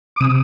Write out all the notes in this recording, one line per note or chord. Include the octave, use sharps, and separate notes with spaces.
D6
C3 D#6